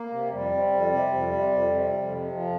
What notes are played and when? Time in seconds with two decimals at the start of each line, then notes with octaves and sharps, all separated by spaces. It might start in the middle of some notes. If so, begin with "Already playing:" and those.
Already playing: A#3
0.12 C3
0.32 F2 G3
0.52 C3
0.72 F2
0.92 C3
1.13 F2
1.33 C3
1.52 F2
1.72 C3
1.92 F2
2.12 C3
2.32 F2 F3